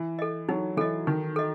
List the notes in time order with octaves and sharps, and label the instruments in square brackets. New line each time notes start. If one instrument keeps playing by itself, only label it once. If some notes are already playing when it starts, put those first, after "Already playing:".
Already playing: [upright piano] E3
[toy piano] A4 D#5
[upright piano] F#3 [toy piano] D#4
[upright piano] E3 [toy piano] A4 D#5
[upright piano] D#3 [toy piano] D#4
[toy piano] A4 D#5